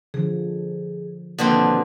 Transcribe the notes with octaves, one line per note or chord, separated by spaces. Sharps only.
D3 F3 G#4
D#2 B2 D3 F3 G3 C4 F#5 A5